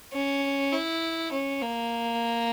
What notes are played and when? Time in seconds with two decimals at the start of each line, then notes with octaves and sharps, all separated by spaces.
0.13 C#4
0.73 E4
1.32 C#4
1.62 A#3